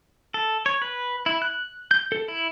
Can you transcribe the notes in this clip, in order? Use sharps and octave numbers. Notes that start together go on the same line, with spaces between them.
A4
C#5
B4
E4
F#6
G6
A4
E4